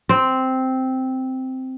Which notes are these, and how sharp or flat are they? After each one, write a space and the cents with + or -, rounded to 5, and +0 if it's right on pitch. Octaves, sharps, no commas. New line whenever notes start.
C4 -5